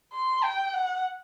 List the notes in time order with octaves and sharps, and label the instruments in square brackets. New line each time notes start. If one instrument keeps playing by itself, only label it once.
[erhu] C6
G5
F#5